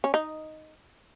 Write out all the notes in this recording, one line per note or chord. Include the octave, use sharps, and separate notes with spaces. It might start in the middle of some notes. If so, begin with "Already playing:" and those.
C#4
D#4